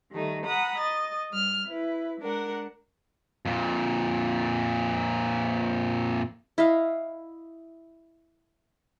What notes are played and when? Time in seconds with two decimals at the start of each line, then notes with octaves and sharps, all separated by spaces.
0.11 D#3 G3 A3 D#4
0.46 F#5 A#5 B5 D#6
0.78 D#5 A6
1.30 G3 F6
1.68 E4 B4
2.21 G#3 D4 A#4 F#5
3.45 F2 A#2
6.58 E4 D#5 F5